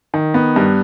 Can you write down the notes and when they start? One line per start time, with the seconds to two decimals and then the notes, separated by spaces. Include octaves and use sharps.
0.14 D#3
0.34 B3
0.56 G2